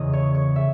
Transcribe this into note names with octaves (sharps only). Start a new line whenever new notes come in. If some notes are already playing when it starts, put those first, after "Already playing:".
Already playing: E2 C#3 E3 D#5
C#5
C#5
C#3 E5